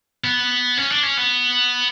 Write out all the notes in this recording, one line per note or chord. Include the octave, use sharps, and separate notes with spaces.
B3
C#4
D4
C#4
B3